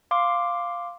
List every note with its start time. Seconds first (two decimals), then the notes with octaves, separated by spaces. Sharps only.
0.11 F5 C6 D6